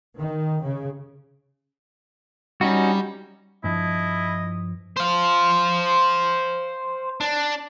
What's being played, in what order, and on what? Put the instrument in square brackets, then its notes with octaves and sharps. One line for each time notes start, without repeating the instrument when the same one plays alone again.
[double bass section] D#3
C#3
[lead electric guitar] G3 [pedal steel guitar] C#4 D#4 F#4
[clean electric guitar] G2 F3 [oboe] E4 [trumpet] D#5
[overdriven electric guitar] C5 F5
D4